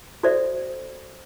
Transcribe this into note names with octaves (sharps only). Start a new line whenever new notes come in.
F#4 A4 C5 D5 E5